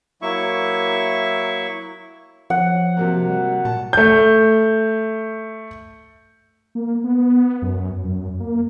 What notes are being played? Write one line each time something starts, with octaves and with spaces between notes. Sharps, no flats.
F#3 A#3 E4 E5 C#6
F3 F#5
C3 F#3 A#3
G3
A#2 A5
A3 G6
A#3
B3
F#2
F#2
A#3